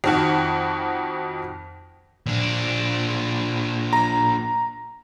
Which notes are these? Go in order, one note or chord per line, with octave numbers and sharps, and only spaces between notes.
F2 D#3 F#4
A#2 D4
A#5